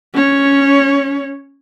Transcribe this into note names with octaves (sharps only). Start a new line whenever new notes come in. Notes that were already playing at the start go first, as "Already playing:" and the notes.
C#4 C#5